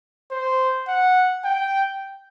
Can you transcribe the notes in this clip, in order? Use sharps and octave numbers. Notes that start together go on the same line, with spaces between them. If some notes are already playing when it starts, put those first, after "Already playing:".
C5
F#5
G5